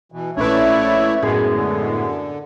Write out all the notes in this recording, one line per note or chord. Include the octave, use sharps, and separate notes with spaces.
B2 E3
A#1 A3 C#4 E4 B4 C#5 D5 E5
F#2 A2 G#3 B3 G#4 G#6
D3